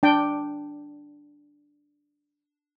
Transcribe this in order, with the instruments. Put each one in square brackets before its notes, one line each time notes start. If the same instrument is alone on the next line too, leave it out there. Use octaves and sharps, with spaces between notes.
[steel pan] D4 G5